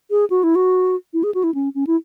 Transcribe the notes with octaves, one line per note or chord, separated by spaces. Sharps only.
G#4
F#4
E4
F#4
E4
G#4
F#4
E4
C#4
C#4
E4